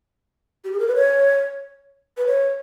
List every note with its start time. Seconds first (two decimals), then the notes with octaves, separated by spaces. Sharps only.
0.64 G4
0.72 G#4
0.79 A#4
0.87 B4
0.95 C#5
2.17 B4
2.26 C#5